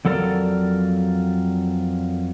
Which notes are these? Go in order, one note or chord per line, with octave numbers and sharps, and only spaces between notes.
F2 F#3 A4 A#4 D5